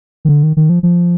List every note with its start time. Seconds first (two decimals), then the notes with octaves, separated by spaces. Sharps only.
0.25 D#3
0.29 D3
0.43 D#3
0.57 D#3
0.69 F3
0.83 F3